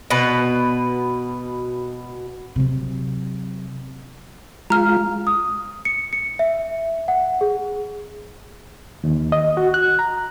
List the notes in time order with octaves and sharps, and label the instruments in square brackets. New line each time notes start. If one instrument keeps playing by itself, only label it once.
[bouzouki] B2 B4
[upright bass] C3 F#3
[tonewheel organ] G#3 F4 [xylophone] A#5 F6
[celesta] D#6
C#7
C#7
E5
F#5
G#4
[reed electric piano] D#2
D#5
F#4
F#6
A#5